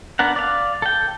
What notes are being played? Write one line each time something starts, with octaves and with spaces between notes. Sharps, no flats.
B3 D4 A#4 F#5
D5 F5
A4 G5